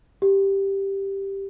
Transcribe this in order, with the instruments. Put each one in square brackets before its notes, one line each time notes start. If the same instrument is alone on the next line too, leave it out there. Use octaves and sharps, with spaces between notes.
[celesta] G4